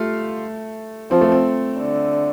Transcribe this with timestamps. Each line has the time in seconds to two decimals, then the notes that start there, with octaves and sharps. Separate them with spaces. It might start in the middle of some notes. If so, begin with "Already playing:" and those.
Already playing: A3 F4 G4
1.11 F3 C4
1.21 A3
1.32 C4
1.80 D3